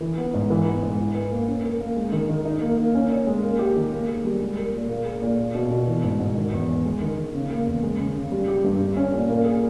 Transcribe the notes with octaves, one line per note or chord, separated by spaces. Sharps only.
E3
B3
G#2
E3
B3
G#2
E4
B4
A#3
C#4
A#4
A#3
G#3
D#3
D#3
D#4
A#3
A#3
C#4
C#5
G#3
A#3
G4
D#3
A#3
G#4
G3
G#3
A#4
A#2
A#3
G#4
A#2
A#3
B2
B2
E3
G#2
G#2
D#3
E2
E2
G#3
D#3
D#3
C#3
A#3
E2
G#3
C#3
C#3
G3
G4
G2
G3
C#4
A#2
A#3
G#4